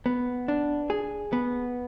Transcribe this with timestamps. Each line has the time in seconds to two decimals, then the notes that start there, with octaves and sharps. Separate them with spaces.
0.06 B3
0.48 D4
0.90 G#4
1.33 B3